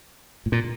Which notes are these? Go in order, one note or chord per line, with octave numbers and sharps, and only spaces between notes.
A2
A#2